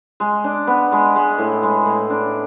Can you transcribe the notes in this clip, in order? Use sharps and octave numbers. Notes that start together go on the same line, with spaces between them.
G#3
D4
B3
G#3
G#3
A2
G#3
A2
D4